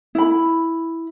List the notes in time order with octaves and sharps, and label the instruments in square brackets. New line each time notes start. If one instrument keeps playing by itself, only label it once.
[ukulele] E4 B5